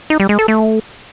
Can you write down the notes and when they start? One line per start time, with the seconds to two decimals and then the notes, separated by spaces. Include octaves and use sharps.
0.10 D#4
0.20 G3
0.29 G#3
0.39 A4
0.48 A3